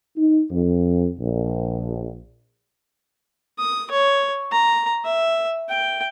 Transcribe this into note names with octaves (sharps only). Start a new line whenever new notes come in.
D#4
F2
A#1
D#6
C#5
A#5
E5
G5